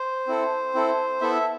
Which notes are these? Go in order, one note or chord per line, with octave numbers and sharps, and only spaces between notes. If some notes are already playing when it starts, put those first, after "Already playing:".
Already playing: C5
C4 E4 A4
C4 E4 A4
B3 E4 A4 E5